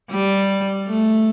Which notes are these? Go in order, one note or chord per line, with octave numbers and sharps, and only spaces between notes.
G3
A3